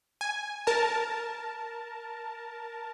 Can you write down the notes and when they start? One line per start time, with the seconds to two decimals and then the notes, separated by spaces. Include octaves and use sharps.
0.21 G#5
0.67 A#4 A5